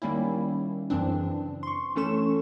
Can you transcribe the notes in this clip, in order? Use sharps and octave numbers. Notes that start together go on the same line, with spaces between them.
D#3 G3 A#3 C#4 E4
F#2 C#3 E3 C4 D4
C6 C#6
E3 A3 C#4 A4 C#6 E7